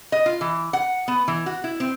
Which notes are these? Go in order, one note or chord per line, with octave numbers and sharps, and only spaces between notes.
D#5
F4
E3
F#5
B3
E3
F#4
E4
C4